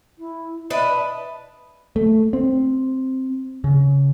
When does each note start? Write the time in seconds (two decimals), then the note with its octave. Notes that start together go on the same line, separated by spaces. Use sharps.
0.18 E4
0.70 D4 B4 D#5 E5
1.96 A3
2.33 C4
3.64 C#3